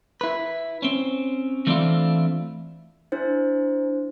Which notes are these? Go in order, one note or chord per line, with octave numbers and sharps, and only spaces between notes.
E4 B4
C4 C#4
E3 A3 C4 D4 E4 F4
D4 E4 C5